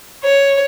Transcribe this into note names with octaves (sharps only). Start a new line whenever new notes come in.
C#5